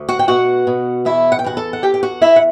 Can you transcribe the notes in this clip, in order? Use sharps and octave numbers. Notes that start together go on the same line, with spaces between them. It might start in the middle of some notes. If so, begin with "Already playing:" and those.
Already playing: D2
F#4 F#5
G5
B2 F#4 F#5
B2
E2 E4 E5
F#5
G5
E2 F#4 F#5
A4 A5
F#5
E2 G4 G5
G5
F#4 F#5
E2 E4 E5
F#5